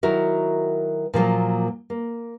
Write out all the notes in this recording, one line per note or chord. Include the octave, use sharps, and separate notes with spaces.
D#3 F#3 E4 F#4 A#4
A#2 F3 F#3 A#3
A#3